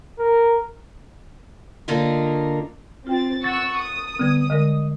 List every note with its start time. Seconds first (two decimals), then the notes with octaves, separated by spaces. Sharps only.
0.19 A#4
1.88 D3 A#3 D4 D#4 F4
3.07 C4 F4 G5 A6
3.44 F#5 C#6 E6 A6
3.78 D#6
4.19 D3 G3 B3 G#6
4.50 D3 G#3 A#4 D#5